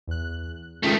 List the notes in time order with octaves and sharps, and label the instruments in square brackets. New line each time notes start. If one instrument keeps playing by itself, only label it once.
[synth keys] E2 F#6
[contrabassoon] C#2 [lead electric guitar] D#3 A3 [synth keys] G5 A5 D#6